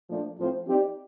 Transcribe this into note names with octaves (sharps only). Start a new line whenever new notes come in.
A#2 F3 A3 D4
A2 F3 C4 F4 C5
F3 C4 D#4 G4 D5